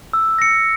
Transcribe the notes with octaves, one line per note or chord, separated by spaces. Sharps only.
E6
A#6 C#7